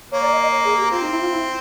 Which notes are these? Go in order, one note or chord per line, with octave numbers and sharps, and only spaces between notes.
A#3 C#5
D5
D#5
D#5
C#5
G#4
G4
C4 F4
D#4
E4
F4
E4